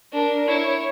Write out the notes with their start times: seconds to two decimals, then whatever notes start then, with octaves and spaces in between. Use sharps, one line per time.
0.13 D4 A#4
0.48 E4 C#5